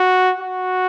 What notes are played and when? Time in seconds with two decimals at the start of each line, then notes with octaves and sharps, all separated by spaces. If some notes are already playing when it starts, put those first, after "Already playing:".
Already playing: F#4
0.41 F#4